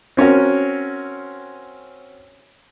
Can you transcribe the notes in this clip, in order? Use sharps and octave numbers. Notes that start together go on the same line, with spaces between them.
C4 C#4 F#4 A#4